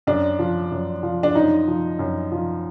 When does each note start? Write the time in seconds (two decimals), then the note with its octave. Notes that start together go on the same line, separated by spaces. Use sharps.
0.07 F#2 D4
0.39 F3
0.71 F#2
1.03 F3
1.23 D4
1.35 F#2 D#4
1.68 F3
1.99 F#2
2.32 F3